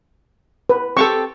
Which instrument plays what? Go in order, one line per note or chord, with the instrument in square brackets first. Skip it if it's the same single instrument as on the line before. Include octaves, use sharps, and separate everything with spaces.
[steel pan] B4
[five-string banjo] C4 G4 A4 [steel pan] C#6